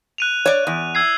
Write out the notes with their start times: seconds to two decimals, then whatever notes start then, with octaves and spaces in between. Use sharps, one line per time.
0.18 F#6 D#7 F7
0.46 C#5 D5
0.67 E2
0.95 E6 G#6 C7